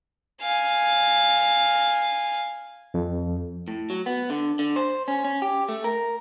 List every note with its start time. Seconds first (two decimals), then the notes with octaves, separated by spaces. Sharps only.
0.42 F5 G#5
2.94 F2
3.68 A2
3.90 F#3
4.06 B3
4.30 D3
4.59 D3
4.76 C5
5.08 C#4
5.25 C#4
5.42 G4
5.69 A3
5.84 A#4